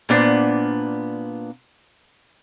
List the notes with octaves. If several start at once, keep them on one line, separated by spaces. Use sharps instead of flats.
A#2 A#3 B3 D4 C5